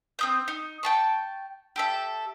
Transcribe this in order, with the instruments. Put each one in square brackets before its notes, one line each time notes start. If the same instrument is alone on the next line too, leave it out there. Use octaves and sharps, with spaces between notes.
[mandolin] C4 D#6 G6
D#4
G5 A5 C#6
G4 A4 E5